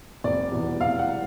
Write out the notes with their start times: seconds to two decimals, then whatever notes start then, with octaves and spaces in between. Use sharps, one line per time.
0.24 F1 D5
0.51 E2 B2
0.80 F1 F5
0.99 F#5